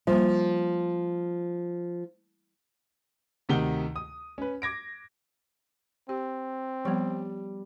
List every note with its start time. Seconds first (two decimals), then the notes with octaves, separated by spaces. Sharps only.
0.07 F3 G3 A#3
3.49 D2 C3 D#3 F#5 G7
3.96 D#6
4.38 C#4 B4
4.62 D6 G#6 A#6 D7
6.09 C4 G4
6.85 F3 G3 B3